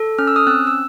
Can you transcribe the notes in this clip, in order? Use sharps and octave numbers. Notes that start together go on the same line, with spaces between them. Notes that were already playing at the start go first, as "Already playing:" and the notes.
Already playing: A4
C#4 F6
E6
D#6 F6
C4 E6 F#6
E6